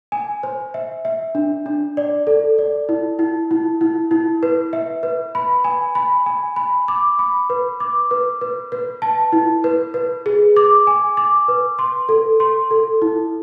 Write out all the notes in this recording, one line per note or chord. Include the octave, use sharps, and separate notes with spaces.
G#5
C5
E5
E5
D4
D4
D5
A4
D5
E4
E4
E4
E4
E4
B4
E5
B4
B5
G#5
B5
G#5
B5
D6
B5
B4
D6
B4
B4
B4
A5
E4
B4
B4
G#4
D6
G#5
D6
B4
C6
A4
C6
A4
E4